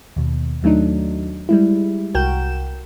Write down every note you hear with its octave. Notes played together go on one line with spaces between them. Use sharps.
D#2 B2
D#2 F#3 A3 D4 D#4
G3 G#3 E4
C2 F#4 A#4 G5 G6 E7